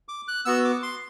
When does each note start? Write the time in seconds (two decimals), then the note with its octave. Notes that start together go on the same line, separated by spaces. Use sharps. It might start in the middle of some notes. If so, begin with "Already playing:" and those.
0.08 D6
0.28 F#6
0.45 B3 F#4 E6
0.65 D6
0.83 C6